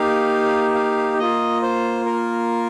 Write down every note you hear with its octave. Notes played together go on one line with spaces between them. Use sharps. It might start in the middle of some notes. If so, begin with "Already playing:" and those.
Already playing: A#3 D#4 G4 F5
F5
A#3 F4 D#5
C5
A#4